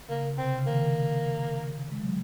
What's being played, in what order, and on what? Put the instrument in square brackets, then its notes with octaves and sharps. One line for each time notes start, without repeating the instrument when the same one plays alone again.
[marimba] C#3 [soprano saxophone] A#3
[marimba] C3 [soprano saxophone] C4
[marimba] C#3
[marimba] D#3 [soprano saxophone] A#3
[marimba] G#3
F#3